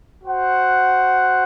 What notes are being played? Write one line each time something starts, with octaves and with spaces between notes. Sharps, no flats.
F#4 C5 F#5